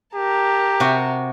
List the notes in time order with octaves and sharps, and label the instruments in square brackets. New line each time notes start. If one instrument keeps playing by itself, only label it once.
[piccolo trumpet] G4 [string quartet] A#4 A5 A#5
[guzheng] C3 F#4